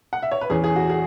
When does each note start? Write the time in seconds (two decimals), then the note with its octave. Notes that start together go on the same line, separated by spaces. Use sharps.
0.13 F#5
0.23 E5
0.31 C#5
0.41 B4
0.50 E2 E3 C#4 G#4
0.64 G#4
0.76 F#4
0.90 G#4